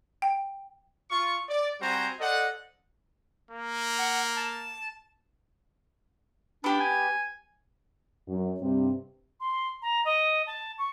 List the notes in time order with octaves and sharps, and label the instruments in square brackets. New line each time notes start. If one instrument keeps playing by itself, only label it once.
[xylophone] G5
[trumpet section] F4 C#6
D5
G3 C4 F#4 C5 G#5 A#5
A4 C5 D5 D#5 F#5
[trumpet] A#3
[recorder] F#5
A5
[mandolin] B3 G4 [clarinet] D4
[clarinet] G#5
[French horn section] F#2
G2 C3
[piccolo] C6
A#5
D#5
A5
C#6